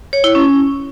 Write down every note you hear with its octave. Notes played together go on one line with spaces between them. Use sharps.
C#5
E4
C#4